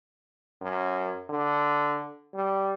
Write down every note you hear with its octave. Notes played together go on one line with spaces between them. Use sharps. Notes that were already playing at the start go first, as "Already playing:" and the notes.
F#2
D3
G3